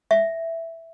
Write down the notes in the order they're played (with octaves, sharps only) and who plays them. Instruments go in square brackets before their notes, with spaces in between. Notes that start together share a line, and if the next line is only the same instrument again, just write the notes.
[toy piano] E5